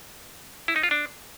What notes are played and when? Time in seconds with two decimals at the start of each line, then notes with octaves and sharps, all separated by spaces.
0.68 E4
0.76 D#4
0.83 F4
0.91 D4